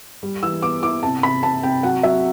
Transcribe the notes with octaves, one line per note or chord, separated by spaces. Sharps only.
G3
E3 E6
B3 D6
E4 D6
C3 A5
C3 B5
C3 A5
C3 G5
F#3 F#5
F#3 E5